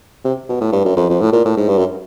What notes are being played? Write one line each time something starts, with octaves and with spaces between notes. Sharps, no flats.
C3
B2
A2
G2
F#2
F2
F2
A2
A#2
A2
G#2
G2
F#2